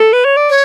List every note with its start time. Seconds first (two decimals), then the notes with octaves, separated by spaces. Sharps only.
0.00 A4
0.13 B4
0.25 C#5
0.37 D5
0.50 C#5